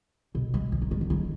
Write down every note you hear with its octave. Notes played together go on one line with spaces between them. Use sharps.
B2
G#3
F3
D#3
G#3
F#3
D#3